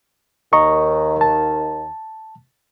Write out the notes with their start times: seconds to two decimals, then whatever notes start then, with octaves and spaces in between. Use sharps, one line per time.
0.53 D#2 D#3 D#5 A#5 C#6
1.21 A5